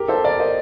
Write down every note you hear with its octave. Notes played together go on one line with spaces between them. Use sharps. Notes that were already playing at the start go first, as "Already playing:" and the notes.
Already playing: G4 A#4
A4 C5
A#4 D5
C5 D#5